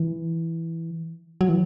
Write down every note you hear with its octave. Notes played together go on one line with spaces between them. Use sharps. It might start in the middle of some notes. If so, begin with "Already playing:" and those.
Already playing: E3
F#3
E3